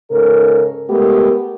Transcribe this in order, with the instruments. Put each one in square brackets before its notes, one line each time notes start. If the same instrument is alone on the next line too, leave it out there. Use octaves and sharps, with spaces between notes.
[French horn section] G#2 C#3 A4 A#4
G#3 A3 B3 G4 A#4